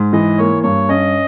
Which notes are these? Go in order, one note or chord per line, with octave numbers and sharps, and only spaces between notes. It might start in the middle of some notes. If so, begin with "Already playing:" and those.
Already playing: G#2
E3 D#5
A#3 C#5
G2 C#5
C#4 D#5